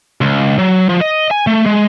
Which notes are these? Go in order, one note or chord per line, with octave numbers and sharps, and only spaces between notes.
C#2
F#3
F3
D#5
G#5
A3
G#3